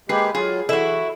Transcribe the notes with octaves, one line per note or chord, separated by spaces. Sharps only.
G#3 A#3 G4 G#4 B4 C7
F#3 F4 G#4
E3 E4 F#4 A4 E7